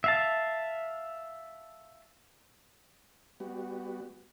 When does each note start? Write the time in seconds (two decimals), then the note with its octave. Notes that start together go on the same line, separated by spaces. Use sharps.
0.04 E5 F5 A5
3.40 G3 B3 F#4